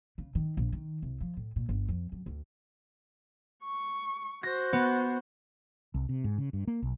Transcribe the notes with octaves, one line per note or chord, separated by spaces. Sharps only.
C#3
D#3
A#1
D#3
C2
F3
A2
A#2
G1
F2
F#2
D2
C#6
F#4 C5 A#6
B3
C2
C3
G#2
C#3
G2
A#3
B1